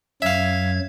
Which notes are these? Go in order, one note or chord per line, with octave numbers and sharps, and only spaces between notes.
F#2 F#3 E5 F5 G#6